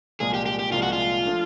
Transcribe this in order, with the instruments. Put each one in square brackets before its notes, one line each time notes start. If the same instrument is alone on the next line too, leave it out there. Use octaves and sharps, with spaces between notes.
[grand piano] C2 A#2 F3 G#3 [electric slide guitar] G#4
[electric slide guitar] G4
G4
G4
[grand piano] C2 A#2 F3 G#3 [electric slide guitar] F4
[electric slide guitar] F#4
F4
[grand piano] F3 A3 D4